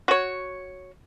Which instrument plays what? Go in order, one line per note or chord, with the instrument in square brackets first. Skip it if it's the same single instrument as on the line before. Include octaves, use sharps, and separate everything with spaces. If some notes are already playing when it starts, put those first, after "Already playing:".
[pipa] F#4 C#5